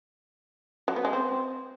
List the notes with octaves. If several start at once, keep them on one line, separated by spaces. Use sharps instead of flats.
F#3
B3
G#3
C4